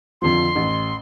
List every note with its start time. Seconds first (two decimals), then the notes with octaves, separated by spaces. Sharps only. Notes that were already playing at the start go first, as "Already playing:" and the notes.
0.22 F2 D3 F3 C6
0.55 A1